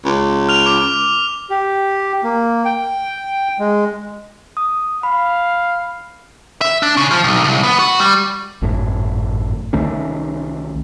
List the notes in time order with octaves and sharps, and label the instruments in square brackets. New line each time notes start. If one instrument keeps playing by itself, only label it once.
[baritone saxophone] C#2
[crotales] F6 F7
D6
[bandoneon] G4
A#3
G5
G#3
[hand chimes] D#6
[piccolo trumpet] F5 [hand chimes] B5
[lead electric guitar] E5
D4
C#3
F3
B1
C2
B3
F#4
G3
[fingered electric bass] G#1 F#2 A2
C2 D#3 A3 C#4